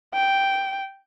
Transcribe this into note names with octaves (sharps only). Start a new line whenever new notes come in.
G5